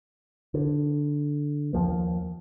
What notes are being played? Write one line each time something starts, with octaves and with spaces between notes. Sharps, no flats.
D3
D#2 F3 A#3